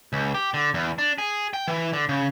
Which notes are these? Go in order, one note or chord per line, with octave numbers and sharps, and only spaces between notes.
C#2
G4
D3
E2
D4
G#4
G5
E3
D3
C#3